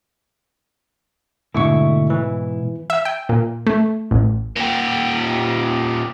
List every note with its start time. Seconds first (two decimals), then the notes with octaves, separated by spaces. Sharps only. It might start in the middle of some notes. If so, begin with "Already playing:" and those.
1.54 G#2 B2 D3 A3 E4 C#6
2.10 E3
2.90 E5
3.05 G5
3.29 A#2
3.67 A3
4.11 A1
4.56 A#2 G4